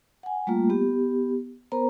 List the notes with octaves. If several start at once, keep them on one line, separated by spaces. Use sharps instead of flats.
F#5 G#5
G3 A3 A#3 F4
B3 G4
B3 A#4 C5 A#5